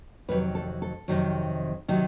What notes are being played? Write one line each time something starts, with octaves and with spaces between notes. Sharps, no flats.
F2 C3 D#3 F#3 B4
A4
A4
F2 C3 D#3 F#3
C3 D#3 F#3